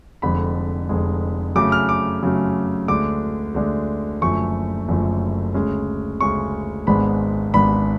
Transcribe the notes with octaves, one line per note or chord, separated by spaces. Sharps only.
F1 F2 D3 G#3 B5
F1 F2 D3 G#3
F#2 C#3 F#3 A3 D6
F6
D6
F#2 C#3 F#3 A3
D2 D3 G#3 D4 D6
D2 D3 G#3 D4
F#1 F#2 D3 F3 A3 C#6
F#1 F#2 D3 F3 A3
D2 C#3 G#3 C#4
D2 C#3 G#3 C#4 C#6
G#1 G#2 G#3 B3 D4 B5
G#1 G#2 G#3 B3 D4 B5